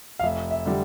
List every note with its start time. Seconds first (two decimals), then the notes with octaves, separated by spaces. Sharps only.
0.19 F5
0.23 F1 E5
0.51 E5
0.66 D3 G3